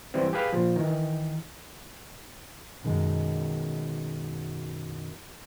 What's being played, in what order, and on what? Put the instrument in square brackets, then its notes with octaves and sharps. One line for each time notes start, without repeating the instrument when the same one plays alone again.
[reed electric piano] E3 G3 C4
G4 G#4 B4 F5
A#2 F3
D#3 E3
[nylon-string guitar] F#2 B2 D#3 G#3